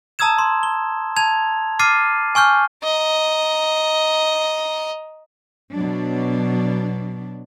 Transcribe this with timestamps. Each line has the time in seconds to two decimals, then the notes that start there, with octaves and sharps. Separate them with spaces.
0.19 A5 A#5 D#6 E6 G#6 E7
0.39 C6
0.63 G7
1.17 A5 G#6 F7
1.79 D6 F6 A6 C7 D#7
2.35 G#5 C#6 F6 G6
2.83 D#5 A#5
5.73 B2 F#3 D4